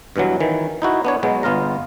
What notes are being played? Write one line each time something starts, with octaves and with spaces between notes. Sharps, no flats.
G2 B2 E3 F#3
D#3 E3
D#4 E4 F#4
B3 D4 C#5
B2 F#3 G#3 B3
G1 B3 F4 F5 A#5